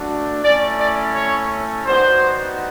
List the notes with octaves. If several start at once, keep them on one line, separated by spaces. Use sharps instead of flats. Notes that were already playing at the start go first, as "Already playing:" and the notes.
Already playing: A3 D4 F#4
A3 C#4 E4 D5
D5
C#5
G3 B3 D#4 F#4 C5